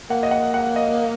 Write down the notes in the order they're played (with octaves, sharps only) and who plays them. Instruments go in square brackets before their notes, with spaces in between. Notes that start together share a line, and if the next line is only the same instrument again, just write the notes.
[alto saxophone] A#3 [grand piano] F#5
[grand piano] D#5
F#5
F#5
D#5